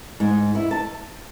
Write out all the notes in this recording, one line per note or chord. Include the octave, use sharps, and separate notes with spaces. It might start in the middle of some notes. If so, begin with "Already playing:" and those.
G#2
E4
A5